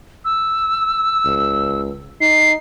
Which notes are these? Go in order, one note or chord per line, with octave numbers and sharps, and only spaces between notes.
E6
C#2
D#4 C7